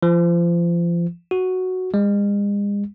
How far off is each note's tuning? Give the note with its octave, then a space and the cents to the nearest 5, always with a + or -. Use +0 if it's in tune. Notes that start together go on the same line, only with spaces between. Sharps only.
F3 -30
F#4 +0
G#3 -40